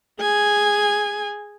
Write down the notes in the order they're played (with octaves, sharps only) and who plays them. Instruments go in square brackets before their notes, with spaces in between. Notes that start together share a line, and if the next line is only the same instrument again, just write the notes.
[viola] G#4 G#5